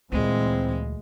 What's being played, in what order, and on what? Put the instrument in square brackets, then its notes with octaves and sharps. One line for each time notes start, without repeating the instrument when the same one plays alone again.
[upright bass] D2 [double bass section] A#2 E3 [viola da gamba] G#3 [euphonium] C4